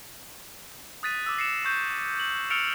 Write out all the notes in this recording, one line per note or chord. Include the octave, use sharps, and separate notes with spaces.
D#6 F#6 A6 B6 D#7
D6 E6 A6
A#6 C7 C#7 E7
C#6 G6
F#7
E6 F6 A6 C#7 D7 F7